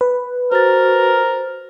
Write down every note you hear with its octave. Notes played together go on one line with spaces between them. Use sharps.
B4
F#4 A#4 C5 A6